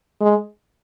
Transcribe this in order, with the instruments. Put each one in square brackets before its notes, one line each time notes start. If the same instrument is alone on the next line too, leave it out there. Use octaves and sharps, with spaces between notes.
[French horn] G#3